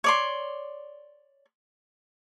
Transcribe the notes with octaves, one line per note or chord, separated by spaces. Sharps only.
C#5 D5 C6